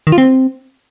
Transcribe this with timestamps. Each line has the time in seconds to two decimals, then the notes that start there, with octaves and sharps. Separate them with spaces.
0.07 D#3
0.12 F4
0.18 C4